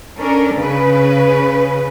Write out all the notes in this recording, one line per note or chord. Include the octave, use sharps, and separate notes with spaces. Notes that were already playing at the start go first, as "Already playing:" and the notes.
C#4 D4 A4 A#4
C#3 B4